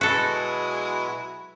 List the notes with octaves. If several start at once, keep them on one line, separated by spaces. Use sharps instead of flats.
B2 F#3 G#3 B3 E4 F#4 A4